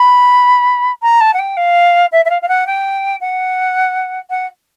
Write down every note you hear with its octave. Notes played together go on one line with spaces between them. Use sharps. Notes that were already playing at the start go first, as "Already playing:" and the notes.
Already playing: B5
A#5
A5
F#5
G5
F5
E5
E5
F5
F5
F#5
G5
F#5
F#5